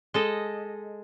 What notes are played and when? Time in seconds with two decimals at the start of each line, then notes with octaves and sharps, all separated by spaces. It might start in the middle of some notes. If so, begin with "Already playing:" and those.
0.14 G#3 A4 D#5